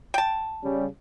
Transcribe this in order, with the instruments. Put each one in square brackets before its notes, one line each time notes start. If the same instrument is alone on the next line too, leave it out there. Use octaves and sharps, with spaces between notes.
[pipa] G5 A5
[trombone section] C#3 G3